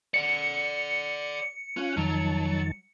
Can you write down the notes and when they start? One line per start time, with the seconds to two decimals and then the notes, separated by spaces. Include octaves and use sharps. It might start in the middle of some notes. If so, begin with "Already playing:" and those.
0.14 D5 F#5 C#7
1.77 C#4 F4 F#6
1.97 F2 D#3 F#3 A5